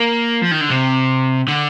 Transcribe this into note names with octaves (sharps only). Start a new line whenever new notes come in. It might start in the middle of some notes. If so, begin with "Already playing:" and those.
Already playing: A#3
F3
D#3
D3
C3
D3